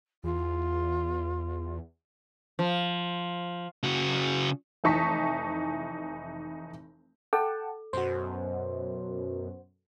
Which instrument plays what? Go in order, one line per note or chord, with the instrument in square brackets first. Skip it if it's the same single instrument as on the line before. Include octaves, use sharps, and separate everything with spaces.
[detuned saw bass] E2 [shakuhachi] F4
[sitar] F3
[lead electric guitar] C#3 F#4
[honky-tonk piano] F1 E3 D#4 A5 C#6 B6
[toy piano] A4 [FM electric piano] F#5 G5 A5
[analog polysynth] F#2 B2 [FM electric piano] F#4 C5